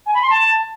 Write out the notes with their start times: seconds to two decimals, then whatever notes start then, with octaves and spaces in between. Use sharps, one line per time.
0.06 G#5
0.14 B5
0.22 C6
0.30 A5